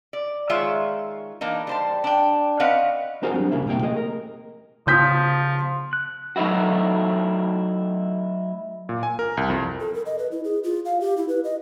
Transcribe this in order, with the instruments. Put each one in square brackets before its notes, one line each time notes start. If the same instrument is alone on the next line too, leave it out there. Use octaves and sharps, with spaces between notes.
[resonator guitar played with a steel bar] D5
D#3 G#3 F4 C#5 E5
E3 A#3 D4 D#4
G3 C5 A5
D4 G5
C4 C#4 B4 D#5 F5 F#5
[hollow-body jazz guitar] B3 D#4 F#4 G#4 A#4 C5
F#3 G3 C4 D4
C2 C#3 A#3 E4 E5
B2 G3 A#3 C4 G5
A3 A#3 G#4 D#5
A#4
[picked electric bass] C#3 B3 [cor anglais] F3 [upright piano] D#6 G6 B6
[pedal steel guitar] F#6
[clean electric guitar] F#3 A3 D#4 E4 F#4
[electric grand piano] A#2
G#5
A#4
C2
F2
[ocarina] A4
A#4
D#5
B4
E4
G#4
F4
F5
G4
E4
B4
D#5